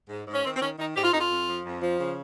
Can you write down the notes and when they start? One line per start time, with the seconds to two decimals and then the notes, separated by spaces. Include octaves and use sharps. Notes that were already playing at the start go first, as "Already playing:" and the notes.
0.09 G#2
0.26 G#2
0.33 C#4
0.44 D#3 C4
0.56 C4
0.62 D#3 C#4
0.79 D#3 D#4
0.96 G#2 G4
1.04 F4
1.12 F2 D#4
1.20 F4
1.30 F2
1.48 F3
1.65 F2
1.82 F3
2.00 C#3